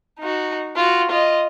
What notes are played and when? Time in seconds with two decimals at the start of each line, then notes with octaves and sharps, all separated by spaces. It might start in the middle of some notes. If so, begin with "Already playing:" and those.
0.19 D#4 F#4
0.76 F4 F#4
1.11 F4 D#5